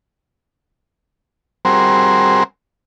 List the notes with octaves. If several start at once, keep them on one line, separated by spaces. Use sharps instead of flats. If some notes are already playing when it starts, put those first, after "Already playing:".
G3 C4 F#4 G#4 A#4 C5